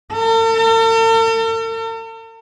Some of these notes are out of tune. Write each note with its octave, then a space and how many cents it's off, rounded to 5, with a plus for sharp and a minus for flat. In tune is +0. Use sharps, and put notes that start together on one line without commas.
A4 +45